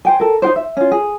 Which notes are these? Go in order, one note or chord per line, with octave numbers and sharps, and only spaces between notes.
C5 G5 G#5
A4 A#4
D#4 F#4 C5
E5
C#4 F4
G#4